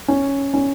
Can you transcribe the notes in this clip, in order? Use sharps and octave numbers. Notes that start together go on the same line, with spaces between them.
C#4
C#4